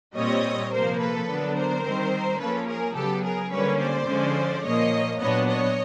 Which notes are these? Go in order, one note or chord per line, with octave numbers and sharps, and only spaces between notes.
A#2 G3 C4 C#5 D#5
C3 F3 A#3 A#4 C5
A4 B4
D3 F#3 B3 D4
A#4 C5
D#3 G3 C4
F3 A#3 C#4 A4 B4
G#4 A#4
C#3 F#3 B3 G4 A4
G#4 A#4
D3 G3 A#3 C#4 B4 C#5
C5 D5
D3 F3 G#3 C#4
A#2 F3 A#3 C#5 D#5
A#2 F#3 B3 D4 C#5 D#5
C#5 D#5